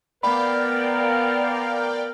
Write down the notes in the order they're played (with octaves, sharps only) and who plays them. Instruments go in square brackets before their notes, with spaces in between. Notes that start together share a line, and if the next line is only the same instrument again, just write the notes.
[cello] B3 [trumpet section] A#4 [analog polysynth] D5 F5 G5 [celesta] B5